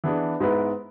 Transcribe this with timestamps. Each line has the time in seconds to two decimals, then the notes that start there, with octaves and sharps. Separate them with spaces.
0.04 E3 B3 D4 G#4
0.40 G#2 G#3 B3 E4 B4